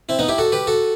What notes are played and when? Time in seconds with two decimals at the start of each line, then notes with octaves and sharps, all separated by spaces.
0.09 C4 E4
0.19 B3 D#4
0.28 E4 G4
0.38 F#4 A4
0.52 G4 B4
0.67 F#4 A4